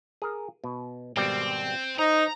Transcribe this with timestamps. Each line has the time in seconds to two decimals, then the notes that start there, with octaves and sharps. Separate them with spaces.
0.22 G#4 A#4
0.64 B2
1.17 G#1 B2 G3 C4
1.99 D#4 C5 A#5